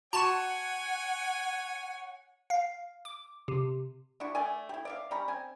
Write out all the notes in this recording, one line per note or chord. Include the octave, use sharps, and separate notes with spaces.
F#4 C#5 F#5 G#5 A5 C6 C#6 E7
F5
D6
C3
D4 E4 F#4
A3 D5 G#5
E4 G4
D5 E5 F5
G3 C#4 A#5 B5
C4 G#5